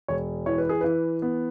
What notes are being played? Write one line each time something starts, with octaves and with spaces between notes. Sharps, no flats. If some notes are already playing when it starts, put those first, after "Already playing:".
E1 C#5
E3 C#5
B4
G#4
E3 B4
B3